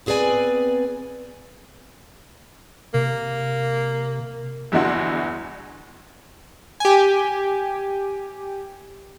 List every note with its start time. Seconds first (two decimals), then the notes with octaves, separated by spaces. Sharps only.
0.06 B3 C4 G#4 B4 D5 G#5
2.94 C3 A#3
4.72 G1 E2 E3 D4 F#4 C6
6.80 G4 G#5